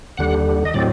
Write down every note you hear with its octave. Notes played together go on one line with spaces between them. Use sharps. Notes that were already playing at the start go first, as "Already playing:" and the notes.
D#2 D3 G3 F#5
D#5
A2 F#3 C4 D5